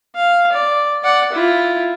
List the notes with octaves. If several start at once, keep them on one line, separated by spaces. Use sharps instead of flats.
F5
D5
D5 F#5
E4 F4